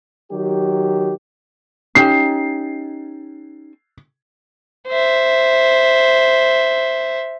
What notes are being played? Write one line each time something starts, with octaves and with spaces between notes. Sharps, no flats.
D#3 F#3 G4
C#4 D#4 G4 C7
C5 E5